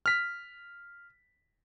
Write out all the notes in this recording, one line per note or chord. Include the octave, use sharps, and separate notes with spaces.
F6 B6